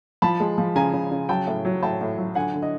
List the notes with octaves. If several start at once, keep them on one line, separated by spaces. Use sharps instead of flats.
F3 A5 B5
G#3
F3
C#3 G#5 A#5
C#3
C#3
F#3 G5 A5
A2
F#3
A2 G5 A5
A2
F#3
D3 F#5 G#5
D3
D#5